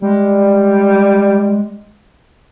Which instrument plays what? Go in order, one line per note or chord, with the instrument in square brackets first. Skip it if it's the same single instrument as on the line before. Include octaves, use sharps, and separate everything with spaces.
[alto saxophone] G3 [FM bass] G#3